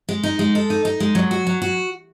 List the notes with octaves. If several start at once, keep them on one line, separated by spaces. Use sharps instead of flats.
G#3
D#4
G#3
A4
D#4
D#4
G#3
F#3
F#4
F#3
F#4